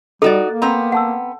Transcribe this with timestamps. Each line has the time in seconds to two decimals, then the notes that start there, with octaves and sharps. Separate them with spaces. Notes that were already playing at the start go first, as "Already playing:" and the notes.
0.22 G3 D#4 F#4 A4 D5
0.45 A#3
0.62 B3 C4 A#5
0.92 F#5 A5 E6